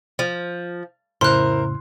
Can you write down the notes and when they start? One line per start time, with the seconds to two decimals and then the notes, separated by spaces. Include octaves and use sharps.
0.19 F3
1.21 F2 A2 C#3 E4 A#4 C5 C6 F#6